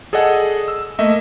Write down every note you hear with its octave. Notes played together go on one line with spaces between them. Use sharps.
G#4 A4 D5 D#5 F#5 G#5
E6
A3 A#3 D#5 E5